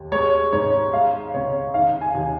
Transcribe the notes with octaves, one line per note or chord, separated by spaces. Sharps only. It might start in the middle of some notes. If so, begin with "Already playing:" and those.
Already playing: D#2
G#3 C#5
G#2 C#5
G#3 F5
C#2 C#5
D#3 F5
G#5
D#2